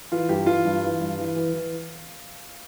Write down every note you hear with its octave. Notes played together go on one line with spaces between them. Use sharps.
E3 F4
G2 G4
E3 F4
G2
E3
G2
E3
E3
E3